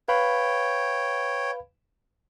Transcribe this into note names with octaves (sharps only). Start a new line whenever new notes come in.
B4 C#5 F5 G5 B5